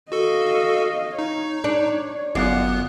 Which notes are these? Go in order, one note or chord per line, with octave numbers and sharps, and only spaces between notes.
F#4 A4 D#5 F5
D#4 C#5
D4
G1 F#2 B3 D5 F5 F#6